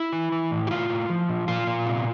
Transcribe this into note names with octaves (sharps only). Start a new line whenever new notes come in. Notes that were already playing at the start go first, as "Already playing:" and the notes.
Already playing: E4
E3
E3
A2
G4
A2 F4
A2
F3
A#2
A#2 F4
A#2
C3